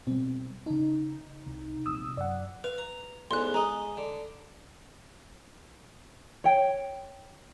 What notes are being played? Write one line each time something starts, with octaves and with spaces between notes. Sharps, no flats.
B2 G3 C4
C#3 D4 D#4
C2
A#1 C3 D#6 E6
F#2 D5 F#5
B4 F5
A#5
A1 E2 G#2 C6 F#6
G#3 D#5 A#5
D3
C#5 G5